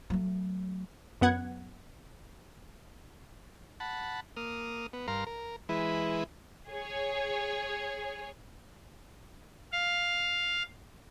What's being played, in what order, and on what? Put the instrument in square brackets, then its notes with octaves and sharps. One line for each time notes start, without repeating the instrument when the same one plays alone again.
[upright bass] F#3 A3
[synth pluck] F#2 B3 F#5 G#6
[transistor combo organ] F#5 A5 B5
A#3 D#6 F6
B3
G2 A#4 F5 A#5 C6
A#4
E3 G#3 E4 B4
[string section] G#4 C#5
[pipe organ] F5